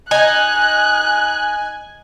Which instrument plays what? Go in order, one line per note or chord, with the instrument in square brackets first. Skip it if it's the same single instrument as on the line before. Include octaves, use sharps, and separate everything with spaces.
[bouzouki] D#4 [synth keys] G#5 [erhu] F#6